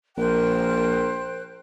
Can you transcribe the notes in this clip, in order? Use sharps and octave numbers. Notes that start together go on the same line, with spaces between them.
A#1 A#4 C5 G5 F#6